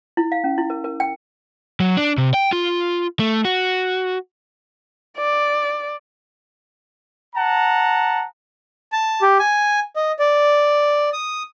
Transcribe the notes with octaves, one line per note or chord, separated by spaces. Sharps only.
E4
F5
C#4
E4
A#4
A#4
G5
F#3
D4
C3
G5
F4
A3
F#4
D5
F#5 A5 A#5
A5
G4
G#5
D#5
D5
D#6